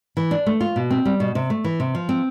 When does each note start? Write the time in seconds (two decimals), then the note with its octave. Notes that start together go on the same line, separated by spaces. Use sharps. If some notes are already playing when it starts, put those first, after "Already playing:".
0.17 E3
0.31 D4
0.46 A3
0.61 F4
0.76 B2
0.91 C4
1.05 G3
1.20 B2
1.35 C3
1.50 A3
1.64 E3
1.80 C3
1.95 F3
2.09 C4